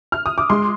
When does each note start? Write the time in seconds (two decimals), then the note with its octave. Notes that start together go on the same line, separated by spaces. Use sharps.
0.12 F6
0.26 D#6
0.38 D6
0.50 G#3 C6